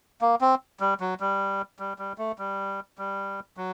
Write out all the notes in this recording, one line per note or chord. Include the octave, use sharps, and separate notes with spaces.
A#3
C4
G3
F#3
G3
G3
G3
A3
G3
G3
F#3